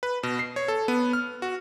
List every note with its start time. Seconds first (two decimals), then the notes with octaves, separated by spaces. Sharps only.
0.03 B4
0.23 B2
0.39 C7
0.56 C#5
0.68 A4
0.88 B3
1.13 F6
1.42 F#4